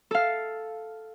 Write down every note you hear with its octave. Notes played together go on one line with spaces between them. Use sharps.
A4 F5